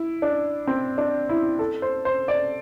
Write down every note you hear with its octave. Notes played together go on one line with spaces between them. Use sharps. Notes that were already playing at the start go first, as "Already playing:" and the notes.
Already playing: E4
D4
C4
D4
E4
A4
C5
C5
D5